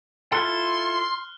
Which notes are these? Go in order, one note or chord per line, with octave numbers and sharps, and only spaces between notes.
E4 F4 A4 C6 F6 F#6